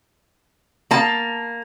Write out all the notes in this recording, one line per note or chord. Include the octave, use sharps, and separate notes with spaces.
A#3 A5